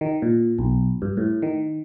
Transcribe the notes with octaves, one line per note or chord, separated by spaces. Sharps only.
D#3
A#2
B1
G2
A2
D#3